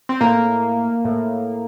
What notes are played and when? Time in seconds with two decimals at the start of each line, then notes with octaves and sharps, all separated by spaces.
0.09 C4
0.21 A2 A#3
1.05 A2